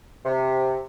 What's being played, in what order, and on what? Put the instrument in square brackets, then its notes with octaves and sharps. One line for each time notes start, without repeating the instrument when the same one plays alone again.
[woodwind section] C3